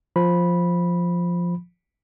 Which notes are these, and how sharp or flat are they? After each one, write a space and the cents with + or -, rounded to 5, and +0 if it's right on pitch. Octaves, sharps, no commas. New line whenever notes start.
F3 +5 B5 -10